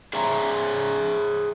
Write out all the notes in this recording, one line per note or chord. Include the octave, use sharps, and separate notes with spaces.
G#4 C5 C#5 E5 G#5 A#5